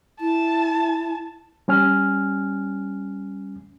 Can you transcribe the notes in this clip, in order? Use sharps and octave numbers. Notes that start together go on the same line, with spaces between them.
E4 A5
G3 C#4 G#5 F6